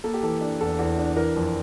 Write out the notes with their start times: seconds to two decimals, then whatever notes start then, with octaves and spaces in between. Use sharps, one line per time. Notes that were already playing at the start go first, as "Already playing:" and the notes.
0.04 A#3 A4
0.14 G4
0.23 E3 A4
0.41 D4
0.60 E2 A4
0.79 E2
0.98 D4
1.16 E3 A#4
1.36 F2